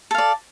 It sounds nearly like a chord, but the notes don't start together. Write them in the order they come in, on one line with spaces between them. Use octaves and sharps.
A4 F5 D5